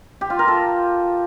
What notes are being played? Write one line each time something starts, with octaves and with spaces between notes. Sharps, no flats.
G4
F4
A#4
A4